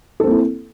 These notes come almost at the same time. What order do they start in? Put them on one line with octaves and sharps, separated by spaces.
A4 C4 A#3 E4